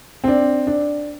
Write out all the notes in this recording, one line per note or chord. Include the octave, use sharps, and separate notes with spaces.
C4 D4
D4